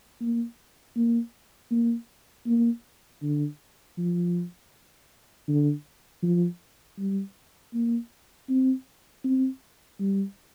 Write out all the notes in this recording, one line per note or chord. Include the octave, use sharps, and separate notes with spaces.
A#3
A#3
A#3
A#3
D3
F3
D3
F3
G3
A#3
C4
C4
G3